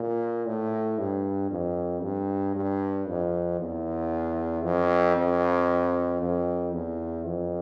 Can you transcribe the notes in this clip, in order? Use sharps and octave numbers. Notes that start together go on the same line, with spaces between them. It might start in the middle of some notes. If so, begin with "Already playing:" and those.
Already playing: A#2
A2
G2
F2
G2
G2
F2
E2
F2
F2
F2
E2
F2